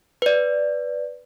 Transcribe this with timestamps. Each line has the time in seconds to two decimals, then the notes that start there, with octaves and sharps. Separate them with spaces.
0.22 B4 D5